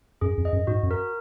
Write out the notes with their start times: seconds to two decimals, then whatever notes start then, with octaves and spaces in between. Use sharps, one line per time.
0.21 F#2 G#4
0.37 F2
0.45 D#5
0.53 F#2
0.67 G#2 F#4
0.83 F#2
0.91 A#4